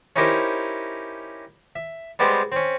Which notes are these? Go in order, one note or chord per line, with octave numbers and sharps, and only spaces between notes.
C#4 D#4 E4 G4 A#4 C5
E5
G3 G#3 B3 C4 G4 C5
C4 C#4